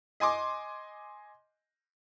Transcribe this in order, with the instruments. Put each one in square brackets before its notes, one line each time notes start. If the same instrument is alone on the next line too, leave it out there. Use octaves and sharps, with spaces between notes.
[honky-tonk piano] D#5 G#5 C6 D6